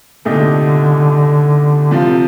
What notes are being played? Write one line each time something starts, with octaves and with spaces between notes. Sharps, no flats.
C2 A#2 D3 A3 D#4 G4
C3 F3 C4 F4